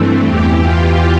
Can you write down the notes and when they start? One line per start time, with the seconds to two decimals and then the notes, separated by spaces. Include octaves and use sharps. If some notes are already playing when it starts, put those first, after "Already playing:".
Already playing: G2 E3 A3 C4
0.25 E2 E3 G4
0.60 F4